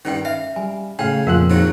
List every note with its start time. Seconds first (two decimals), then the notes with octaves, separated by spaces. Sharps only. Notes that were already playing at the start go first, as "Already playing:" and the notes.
0.05 G2 D#3 C#4 G5
0.25 E5 F5
0.56 G3 G#5
0.99 A2 C#3 A3 F5 G5 G#5
1.27 F2 A#2 F3 F4 A#4 F5 F#5 F#6
1.50 G#2 D#3 F#3